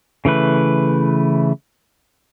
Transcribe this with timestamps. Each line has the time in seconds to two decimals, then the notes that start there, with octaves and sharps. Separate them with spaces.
0.25 C#3 E3 A3 B4